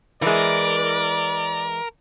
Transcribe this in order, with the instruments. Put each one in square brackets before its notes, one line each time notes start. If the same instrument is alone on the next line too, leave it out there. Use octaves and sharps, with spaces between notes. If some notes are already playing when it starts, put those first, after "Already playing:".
[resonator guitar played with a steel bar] E3 G#3 [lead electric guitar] A#4 [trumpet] D5